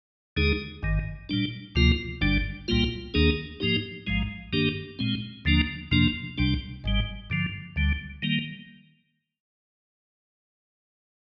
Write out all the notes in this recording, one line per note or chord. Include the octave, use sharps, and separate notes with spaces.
D#2 D3 G#3 D#4 G#4
G#1 G2 D#3
A#2 G3 D4
D2 C3 F3 A#3 F4
G1 G2 D3 G3 D4
C2 A#2 G3 A#3 F4
D#2 D#3 A#3 D4 G#4
G#2 F3 A#3 D#4 G4
A#1 G#2 F3 G#3
G2 D#3 A#3 D4 G4
A#2 G#3 C4
D#2 D3 F3 A#3 D4
F2 C3 F3 A#3 D4
C2 C3 G3 D4
G#1 G#2 G3
G2 D3 F3
D2 D3 G3
D#3 G3 A#3